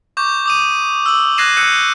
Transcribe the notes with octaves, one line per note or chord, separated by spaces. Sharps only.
C#6 D6 G6
D6 D#6 D#7
E6 F#7
F#6 G#6 A#6 C7 D#7 E7
E6 F#6 G6 C#7 D#7